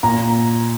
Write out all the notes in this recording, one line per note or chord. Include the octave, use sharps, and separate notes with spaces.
A#2 A#5